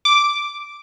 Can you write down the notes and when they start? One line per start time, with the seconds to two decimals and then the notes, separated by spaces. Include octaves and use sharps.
0.05 D6